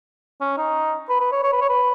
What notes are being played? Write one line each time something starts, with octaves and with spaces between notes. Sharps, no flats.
C#4
D#4
B4
B4
C#5
C#5
B4
C#5
B4